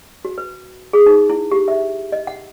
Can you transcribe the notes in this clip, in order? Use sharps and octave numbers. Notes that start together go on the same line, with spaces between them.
F#4
B4
G#4
D#4
E4
G4
E5
D#5
F#5